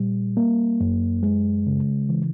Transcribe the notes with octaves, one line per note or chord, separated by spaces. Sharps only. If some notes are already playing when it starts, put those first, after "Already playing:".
Already playing: A#2 G3
A#3
F#2
G#3
C#3
E3